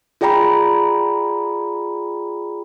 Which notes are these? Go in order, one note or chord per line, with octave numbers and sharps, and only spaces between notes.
F4 G#4 D5 G5 A#5 B5